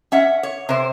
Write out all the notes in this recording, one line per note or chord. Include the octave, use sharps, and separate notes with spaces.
C#4 E5 F#5
C#5
C3 C5